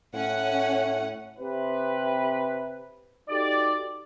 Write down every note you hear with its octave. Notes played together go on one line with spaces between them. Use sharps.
A2 C#4 F#5
C3 B4
D#4 F#4 G4 A4 D5